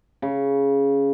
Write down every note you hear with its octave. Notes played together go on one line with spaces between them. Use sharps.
C#3